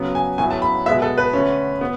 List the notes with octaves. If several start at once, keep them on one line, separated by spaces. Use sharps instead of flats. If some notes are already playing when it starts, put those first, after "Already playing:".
Already playing: C#3 F#3 B3
G#5
A2 F#3 B3 G#5
A5
B5
B2 G#3 B3 E5
A4
B4
D3 A3 C#4
B3